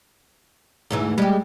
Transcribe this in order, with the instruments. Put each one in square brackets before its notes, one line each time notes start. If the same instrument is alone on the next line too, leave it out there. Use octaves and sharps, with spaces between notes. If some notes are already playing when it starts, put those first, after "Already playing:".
[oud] D2 G#2 E3
[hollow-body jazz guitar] G3 [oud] G#3 G4